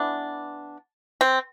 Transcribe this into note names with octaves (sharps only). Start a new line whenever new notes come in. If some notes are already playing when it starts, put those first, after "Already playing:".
Already playing: E3 B3 D4
C4